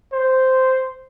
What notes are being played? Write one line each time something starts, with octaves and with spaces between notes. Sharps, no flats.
C5